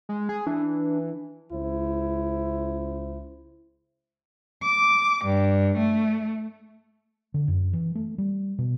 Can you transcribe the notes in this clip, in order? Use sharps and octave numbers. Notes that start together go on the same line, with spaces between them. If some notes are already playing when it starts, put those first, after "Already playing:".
G#3
G#4
E3 D4
C#2 E4 C5
D6
G2
A3
D3
F#2
E3
A3
G3
B2